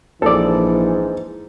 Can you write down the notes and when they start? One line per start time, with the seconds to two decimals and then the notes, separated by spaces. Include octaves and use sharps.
0.22 A#1 G#2 E3 A4 D5